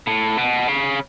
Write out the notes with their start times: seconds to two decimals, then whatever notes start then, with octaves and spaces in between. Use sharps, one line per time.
0.07 A2
0.37 B2
0.68 C#3